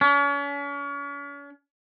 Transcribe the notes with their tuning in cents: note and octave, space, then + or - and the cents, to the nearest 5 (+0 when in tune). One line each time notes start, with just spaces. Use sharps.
C#4 +40